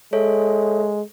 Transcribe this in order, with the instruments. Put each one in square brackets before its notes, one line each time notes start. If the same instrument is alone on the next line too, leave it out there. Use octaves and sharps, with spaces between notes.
[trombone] G#3 [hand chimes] A4 C#5 E5